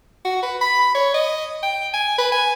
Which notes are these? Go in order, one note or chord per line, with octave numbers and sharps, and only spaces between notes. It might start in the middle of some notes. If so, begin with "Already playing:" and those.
F#4
B4
B5
C#5
D#5
G5
G#5
B4
G#5